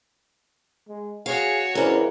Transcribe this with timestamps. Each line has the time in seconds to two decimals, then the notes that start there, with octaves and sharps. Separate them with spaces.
0.88 G#3
1.26 F#4 G#4 C#5 F5
1.75 G#2 C#3 E3 C#4 D4 A#4